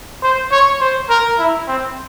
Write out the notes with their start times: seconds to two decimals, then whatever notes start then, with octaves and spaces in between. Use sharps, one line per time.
0.23 C5
0.51 C#5
0.81 C5
1.09 A#4
1.38 E4
1.68 C4